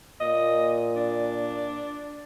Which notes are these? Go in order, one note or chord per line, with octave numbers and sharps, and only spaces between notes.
A#2 D#5
D4